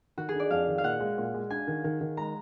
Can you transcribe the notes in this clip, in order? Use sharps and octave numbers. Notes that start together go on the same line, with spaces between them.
D#3 F#4
G#4
D4
D5
F2 F5
D#3
F5
A#2 F#5
G#3
A#2
G#3
D4 G#5
D#3
D#3
D#3
G#3 A#5